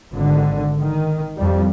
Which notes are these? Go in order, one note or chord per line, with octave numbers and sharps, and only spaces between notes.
G#1 D3
D#3
F2 G3